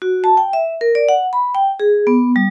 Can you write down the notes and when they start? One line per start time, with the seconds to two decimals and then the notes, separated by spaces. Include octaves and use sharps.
0.02 F#4
0.24 A5
0.37 G5
0.53 E5
0.81 A#4
0.95 D5
1.09 F#5
1.33 B5
1.55 G5
1.80 G#4
2.07 B3
2.36 G3